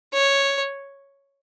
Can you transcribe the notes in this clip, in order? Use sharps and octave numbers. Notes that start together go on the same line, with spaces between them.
C#5